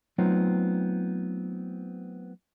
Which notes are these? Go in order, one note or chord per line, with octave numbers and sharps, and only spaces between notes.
F#3 A3 B3 C4 D#4 F4